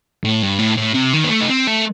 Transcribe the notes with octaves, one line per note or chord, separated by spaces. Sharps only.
A2
G2
A2
A2
C3
D#3
B3
A3
D#4
C4
A3